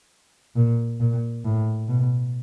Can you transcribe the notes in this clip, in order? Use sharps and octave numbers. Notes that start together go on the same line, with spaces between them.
A#2
A#2
A2
B2